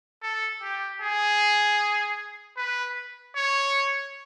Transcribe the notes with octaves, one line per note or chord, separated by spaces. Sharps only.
A4
G4
G#4
B4
C#5